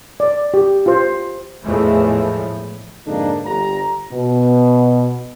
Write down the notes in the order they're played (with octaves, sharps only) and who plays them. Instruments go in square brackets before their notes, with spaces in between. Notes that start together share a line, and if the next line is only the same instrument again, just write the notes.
[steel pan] D5
G4
F4 C5
[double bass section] E2 A2 E3 F3 G#3 A3
[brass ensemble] F2 G#2 D3 A#3 D4 D#4
G1 A#5
[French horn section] B2 B3